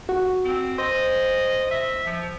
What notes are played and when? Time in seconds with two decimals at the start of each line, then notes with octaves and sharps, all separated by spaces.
0.09 F#4
0.45 C4
0.78 C5 D#5
1.71 E5
2.06 F3